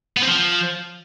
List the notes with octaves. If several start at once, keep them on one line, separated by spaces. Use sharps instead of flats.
B3
C4
F3